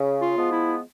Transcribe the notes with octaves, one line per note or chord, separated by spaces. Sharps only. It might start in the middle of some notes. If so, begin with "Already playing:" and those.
Already playing: C#3
F4
F3 G#3 B3
E4